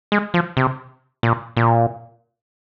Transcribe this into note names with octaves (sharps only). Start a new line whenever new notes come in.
G#3
F3
C3
A#2
A#2